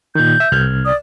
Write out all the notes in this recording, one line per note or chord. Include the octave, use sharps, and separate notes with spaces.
A#2 D#3 G6
E5
C2 F6 G#6
D5 D#6